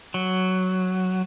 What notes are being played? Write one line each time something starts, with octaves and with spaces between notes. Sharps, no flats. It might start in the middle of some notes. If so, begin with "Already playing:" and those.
F#3